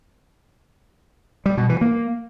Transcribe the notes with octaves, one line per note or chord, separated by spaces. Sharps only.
G3
B2
E3
A#3